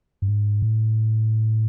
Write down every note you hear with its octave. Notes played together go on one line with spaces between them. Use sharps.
G2
G#2
A2